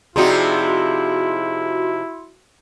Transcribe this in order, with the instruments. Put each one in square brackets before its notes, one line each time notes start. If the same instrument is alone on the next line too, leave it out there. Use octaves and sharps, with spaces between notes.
[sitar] C3 F3 D#4 [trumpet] E4 [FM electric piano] F#4 C6 [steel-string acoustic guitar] G#4 D5